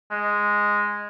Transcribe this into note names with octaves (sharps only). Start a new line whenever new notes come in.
G#3